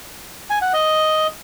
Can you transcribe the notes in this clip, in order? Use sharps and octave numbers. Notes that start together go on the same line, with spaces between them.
G#5
F#5
D#5